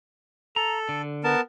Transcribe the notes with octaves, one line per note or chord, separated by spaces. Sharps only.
A4 A#5
D3
B3 A#4 A5